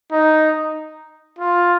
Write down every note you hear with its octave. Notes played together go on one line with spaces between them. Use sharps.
D#4
F4